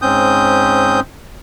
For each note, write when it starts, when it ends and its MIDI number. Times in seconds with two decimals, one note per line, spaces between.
0.02 1.00 44
0.02 1.00 60
0.02 1.00 61
0.02 1.00 87
0.02 1.00 91